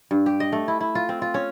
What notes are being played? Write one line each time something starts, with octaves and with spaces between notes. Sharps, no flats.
G2
G4
D#5
A3
E4
E4
F4
C4
F4
C#4